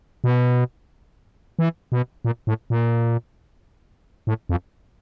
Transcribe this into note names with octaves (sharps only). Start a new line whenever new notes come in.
B2
E3
B2
A#2
A2
A#2
A2
F2